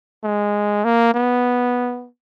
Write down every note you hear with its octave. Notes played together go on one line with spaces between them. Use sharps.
G#3
A#3
B3